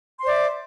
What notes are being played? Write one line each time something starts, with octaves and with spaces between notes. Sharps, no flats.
C5 D5 E5 C6